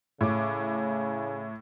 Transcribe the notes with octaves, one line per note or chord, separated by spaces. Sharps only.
A2 C#3 D6